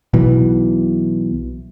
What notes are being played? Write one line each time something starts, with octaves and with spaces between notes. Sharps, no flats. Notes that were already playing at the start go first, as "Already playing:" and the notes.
B1 B2 E3